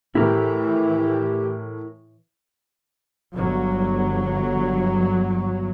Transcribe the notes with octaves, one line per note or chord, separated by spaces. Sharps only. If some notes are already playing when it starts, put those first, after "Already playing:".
A2 E3 E4 G4 A#4
G1 F#3